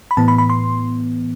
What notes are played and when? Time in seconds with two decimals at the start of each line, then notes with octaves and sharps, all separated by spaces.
0.11 B5
0.17 A2 E3 B3 A5
0.28 B5
0.38 B5
0.50 C6